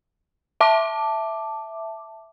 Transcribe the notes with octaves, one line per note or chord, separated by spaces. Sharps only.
E5 A5 D6